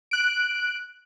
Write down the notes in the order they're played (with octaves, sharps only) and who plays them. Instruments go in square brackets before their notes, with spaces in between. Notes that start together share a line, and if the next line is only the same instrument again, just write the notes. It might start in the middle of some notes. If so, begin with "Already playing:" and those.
[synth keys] F#6 D7